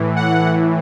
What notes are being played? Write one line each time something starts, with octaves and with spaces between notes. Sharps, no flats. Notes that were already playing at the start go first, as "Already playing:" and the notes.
Already playing: A2 E3
F#5